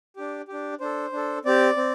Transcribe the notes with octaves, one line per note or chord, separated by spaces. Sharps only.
D4 G4
D4 G4
D4 A4 C5
D4 A4
C4 G4 D5
C4